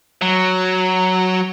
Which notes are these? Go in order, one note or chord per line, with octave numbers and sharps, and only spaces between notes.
F#3